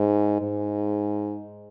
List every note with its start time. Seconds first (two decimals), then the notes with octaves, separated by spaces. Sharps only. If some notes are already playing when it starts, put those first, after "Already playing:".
Already playing: G#2
0.42 G#2